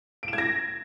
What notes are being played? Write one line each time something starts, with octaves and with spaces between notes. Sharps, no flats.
D7
E7
G#6
A#6